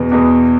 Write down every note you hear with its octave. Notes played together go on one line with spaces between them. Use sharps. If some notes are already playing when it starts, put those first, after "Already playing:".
Already playing: E2 B2 B3
E2 B2 B3